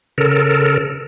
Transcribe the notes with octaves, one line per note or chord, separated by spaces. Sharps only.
C#3 A4 A#4